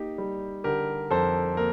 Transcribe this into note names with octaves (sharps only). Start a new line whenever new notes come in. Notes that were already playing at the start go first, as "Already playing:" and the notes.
Already playing: A#3 D#4 G4
G3
D3 G4 A#4
F2 A4 C5
A#3 A#4